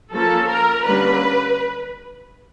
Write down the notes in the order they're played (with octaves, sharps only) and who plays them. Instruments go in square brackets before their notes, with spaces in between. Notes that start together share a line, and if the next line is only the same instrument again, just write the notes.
[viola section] F3 A#3 C#4 A4
A#4
D3 G3 A#3 C#4 B4